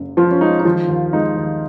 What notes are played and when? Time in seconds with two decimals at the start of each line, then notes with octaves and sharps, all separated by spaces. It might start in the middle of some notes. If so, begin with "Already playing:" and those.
Already playing: F#1 F#2
0.17 F3 F4
0.31 C#4
0.41 G#3 D#4
0.60 D#4
0.65 D#3 F3 F4
0.89 D#2
1.13 G#3 D#4
1.37 D#2